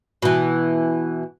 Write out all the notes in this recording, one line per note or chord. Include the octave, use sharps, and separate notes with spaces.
B2 E3